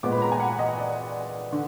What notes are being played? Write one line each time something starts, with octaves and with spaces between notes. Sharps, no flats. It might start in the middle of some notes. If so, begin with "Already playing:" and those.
A#2 G#3 B3 D6
B5
A#5
G#5
F#5
D#5
D5
D3